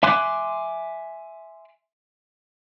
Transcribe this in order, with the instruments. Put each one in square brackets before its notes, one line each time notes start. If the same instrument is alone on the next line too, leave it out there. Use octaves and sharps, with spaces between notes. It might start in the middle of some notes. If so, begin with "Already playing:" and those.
[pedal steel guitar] E5 G#5 C6 D6 F#6